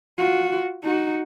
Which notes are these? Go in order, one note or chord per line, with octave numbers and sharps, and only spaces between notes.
F4 F#4
D#4 F#4